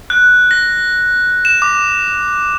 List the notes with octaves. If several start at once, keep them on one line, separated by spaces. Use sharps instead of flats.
F#6
A#6
E7
D6